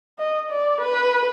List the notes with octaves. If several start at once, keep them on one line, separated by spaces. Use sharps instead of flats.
D#5
D5
B4